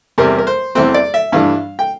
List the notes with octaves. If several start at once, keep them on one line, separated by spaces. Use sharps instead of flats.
E2 C3 G3 C4 A#4
A#4
C5
E2 E3 A3 C4 C5
D5
E5
G2 E3 A3 D4 F5
G5